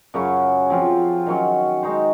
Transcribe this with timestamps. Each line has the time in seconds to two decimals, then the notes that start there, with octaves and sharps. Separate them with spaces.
0.14 F#2 C#3 F#3 C#4
0.70 F3 C4 F4
1.27 D#3 F#3 C#4
1.83 G#3 D#4 F#4 C5